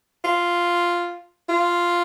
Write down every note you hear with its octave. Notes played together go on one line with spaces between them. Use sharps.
F4
F4